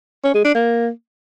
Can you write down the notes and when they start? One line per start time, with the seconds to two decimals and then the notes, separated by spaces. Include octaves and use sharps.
0.24 C#4
0.34 G#3
0.45 D4
0.55 A#3